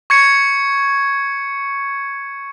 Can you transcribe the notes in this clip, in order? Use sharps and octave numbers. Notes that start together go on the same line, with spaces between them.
C#6 G#6 C#7